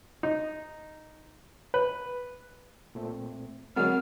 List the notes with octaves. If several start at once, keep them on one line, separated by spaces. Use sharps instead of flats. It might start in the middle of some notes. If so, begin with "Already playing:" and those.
D#4
B4
A#2 A3 C4
D3 F#3 G#3 C4 A#4 F#5 F6